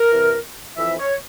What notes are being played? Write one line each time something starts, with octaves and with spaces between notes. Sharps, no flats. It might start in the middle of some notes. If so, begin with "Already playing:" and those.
Already playing: A#4
C2 C3 E3
F2 E3 E5
C#5